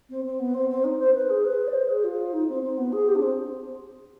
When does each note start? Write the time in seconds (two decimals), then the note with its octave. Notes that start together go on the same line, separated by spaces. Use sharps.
0.10 C4
0.25 C4
0.39 B3
0.54 C4
0.69 C4
0.84 D#4
0.99 C5
1.14 B4
1.29 G#4
1.44 B4
1.67 D5
1.73 C5
1.89 G#4
2.04 F4
2.33 D#4
2.48 C4
2.63 C4
2.77 B3
2.92 G#4
3.08 G4
3.15 D4
3.22 C4